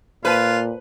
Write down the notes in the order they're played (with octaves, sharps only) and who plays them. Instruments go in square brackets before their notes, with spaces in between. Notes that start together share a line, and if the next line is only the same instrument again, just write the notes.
[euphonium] A#2 [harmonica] F4 [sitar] B4 [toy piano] C5 A5